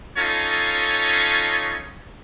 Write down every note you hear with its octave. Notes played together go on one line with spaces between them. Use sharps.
C#4 D#4 F4 A4 C#5